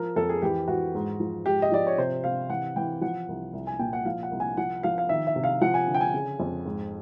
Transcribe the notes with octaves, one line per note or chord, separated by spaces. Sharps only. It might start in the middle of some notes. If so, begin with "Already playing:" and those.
Already playing: F3 A#4
F2 A4
G#4
E3 G4
E3 F#4
G#2
F3
G#2 G4
D#5
F3 D5
C#5
C3 C5
C3 F5
E3 F#5
E3 G5
F3 F#5
C2
C2
G#5
A#2 G5
F#5
F3 F5
F#5
C2
G#5
F3 F#5
F3 F5
F5
D#3 E5
E5
C3
F5
F3 F#5
G#5
D3
G5
G#5
C#3
F2
G#2